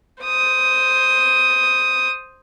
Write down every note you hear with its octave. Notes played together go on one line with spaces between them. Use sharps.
C5 D#6